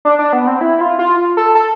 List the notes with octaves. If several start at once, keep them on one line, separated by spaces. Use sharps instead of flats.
D4
D4
B3
C4
E4
F4
F4
A4
A4